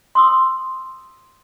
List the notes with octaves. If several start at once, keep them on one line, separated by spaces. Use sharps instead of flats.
C6 D#6 E6